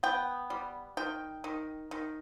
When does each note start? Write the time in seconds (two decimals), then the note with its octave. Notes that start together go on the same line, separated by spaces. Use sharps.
0.03 B3 G5
0.50 G3
0.97 D#3 G5
1.44 D#3
1.91 D#3